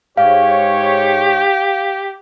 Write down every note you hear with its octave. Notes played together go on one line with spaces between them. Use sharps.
G#2 G4 C#5 F5